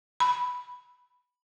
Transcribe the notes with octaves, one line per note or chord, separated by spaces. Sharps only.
B5